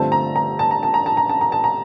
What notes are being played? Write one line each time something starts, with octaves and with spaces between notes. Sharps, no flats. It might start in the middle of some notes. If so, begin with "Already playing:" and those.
Already playing: G2 D3 F3 A3 C4 A5
A#5
A#5
A5
A#5
A5
A#5
A5
A#5
A5
A#5
A5
A#5